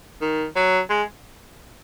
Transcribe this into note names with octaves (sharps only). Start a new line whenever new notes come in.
D#3
F#3
G#3